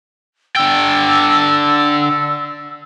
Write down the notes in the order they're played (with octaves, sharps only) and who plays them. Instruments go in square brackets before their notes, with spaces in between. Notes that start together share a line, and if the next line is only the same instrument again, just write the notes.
[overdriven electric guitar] D3 G5 [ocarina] E6